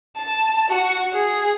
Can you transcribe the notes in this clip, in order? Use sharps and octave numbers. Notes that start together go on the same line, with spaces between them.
A5
F#4
G#4